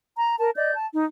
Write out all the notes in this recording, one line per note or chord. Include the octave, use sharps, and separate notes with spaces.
A#5
A#4 A5
D5 D#5 G6
A5
D#4